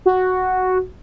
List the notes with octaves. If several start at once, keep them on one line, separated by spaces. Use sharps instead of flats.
F#4